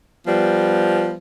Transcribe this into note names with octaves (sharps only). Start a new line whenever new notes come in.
F3 G3 B3